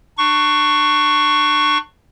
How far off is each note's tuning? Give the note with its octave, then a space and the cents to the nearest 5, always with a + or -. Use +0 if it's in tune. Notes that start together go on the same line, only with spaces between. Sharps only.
D4 +30 C#6 +0